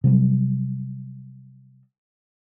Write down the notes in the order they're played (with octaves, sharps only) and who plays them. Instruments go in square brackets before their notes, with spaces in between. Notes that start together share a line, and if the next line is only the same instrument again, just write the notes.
[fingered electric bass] C3 F#3 G3